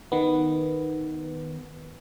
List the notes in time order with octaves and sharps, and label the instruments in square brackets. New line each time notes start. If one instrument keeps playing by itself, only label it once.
[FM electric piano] D#3 B3